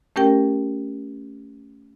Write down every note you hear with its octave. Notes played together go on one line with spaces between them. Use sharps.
A3 C#4 G4 A#4 G5